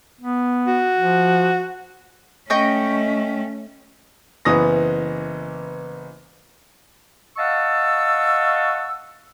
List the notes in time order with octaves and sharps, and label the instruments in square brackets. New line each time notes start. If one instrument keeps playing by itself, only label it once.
[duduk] B3
[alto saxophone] F#4
[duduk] F3
[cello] A3 C#4 [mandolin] D#5 G5 C#6
[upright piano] F#1 E3 B3 D#6 A#6
[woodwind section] D#5 F5 F#5 A5 C#6 E6